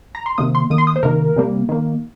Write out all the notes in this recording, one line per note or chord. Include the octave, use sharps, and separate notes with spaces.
A#5
C6
C3 D#3 A#3 D#6
C6
D#3 A#3 D#6
C6
D#6
C5
C3 D#3 A#3 A#4
C3 G3 A#3
D#3 A#3